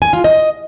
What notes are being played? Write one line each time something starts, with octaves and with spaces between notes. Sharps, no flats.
G#5
F4
D#5